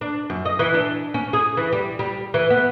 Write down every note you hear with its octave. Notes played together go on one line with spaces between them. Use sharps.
D4
F#2
D#5
E3
D4
C#4
G#4
E3
G3
G3
E3
B3